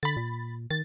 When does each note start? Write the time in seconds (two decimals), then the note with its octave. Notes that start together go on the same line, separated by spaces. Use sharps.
0.03 D3 B5 A6
0.17 A#2
0.71 D#3 A6